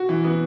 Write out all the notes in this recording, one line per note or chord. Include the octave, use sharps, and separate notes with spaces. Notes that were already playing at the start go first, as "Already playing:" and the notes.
Already playing: F#4
E3
B3